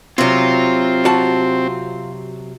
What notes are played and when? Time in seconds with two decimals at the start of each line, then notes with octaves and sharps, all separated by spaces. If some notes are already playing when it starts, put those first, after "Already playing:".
0.18 C3 F#3 C4 F4
1.05 F#4 A5